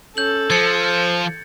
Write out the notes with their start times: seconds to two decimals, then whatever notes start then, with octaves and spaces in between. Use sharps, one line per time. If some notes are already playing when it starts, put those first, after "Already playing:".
0.17 C#4 A4 G6 F#7
0.50 F3 C5 G#6 A6 C#7